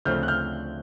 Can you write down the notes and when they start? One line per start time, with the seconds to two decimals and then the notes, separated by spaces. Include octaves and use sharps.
0.05 D2 C#3 F3 A3 C4 F6 G6
0.23 F#6
0.28 F6 G6